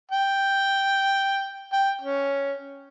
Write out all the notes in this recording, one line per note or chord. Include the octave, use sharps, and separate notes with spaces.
G5
G5
C#4